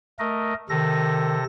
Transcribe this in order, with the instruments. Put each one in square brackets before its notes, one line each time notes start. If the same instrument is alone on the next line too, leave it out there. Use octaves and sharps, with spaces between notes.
[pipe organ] A3 A#4 D#5
[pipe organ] C3 A4 A#6 [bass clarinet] D#3